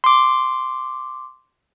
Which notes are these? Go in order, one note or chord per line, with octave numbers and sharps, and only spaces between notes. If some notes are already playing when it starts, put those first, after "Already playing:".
C6 D6